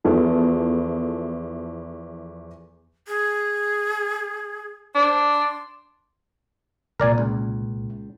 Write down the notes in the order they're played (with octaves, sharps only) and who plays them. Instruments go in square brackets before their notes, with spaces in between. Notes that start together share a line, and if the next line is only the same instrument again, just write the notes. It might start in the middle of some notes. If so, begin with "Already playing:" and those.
[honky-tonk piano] E2 F3 E4 A4
[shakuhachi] G#4
[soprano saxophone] D4 [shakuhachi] C5
[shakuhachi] C6
[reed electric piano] C2 A#2 [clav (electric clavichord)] A#4 D5 G#5
[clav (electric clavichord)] C#2